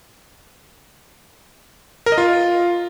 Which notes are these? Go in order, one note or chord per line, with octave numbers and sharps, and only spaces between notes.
A#4
D#5
F4